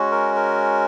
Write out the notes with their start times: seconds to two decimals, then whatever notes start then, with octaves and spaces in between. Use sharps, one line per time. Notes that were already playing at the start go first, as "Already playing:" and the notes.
Already playing: G#3 C#4 F#4
0.11 A#4
0.36 A#4